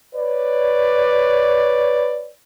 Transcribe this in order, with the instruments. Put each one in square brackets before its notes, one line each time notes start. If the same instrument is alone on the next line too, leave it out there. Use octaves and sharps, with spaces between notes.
[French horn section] B4 C#5 D5